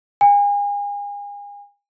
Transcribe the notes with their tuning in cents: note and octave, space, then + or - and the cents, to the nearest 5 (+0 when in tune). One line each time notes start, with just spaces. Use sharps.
G#5 -35